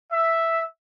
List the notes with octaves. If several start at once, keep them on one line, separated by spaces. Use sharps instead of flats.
E5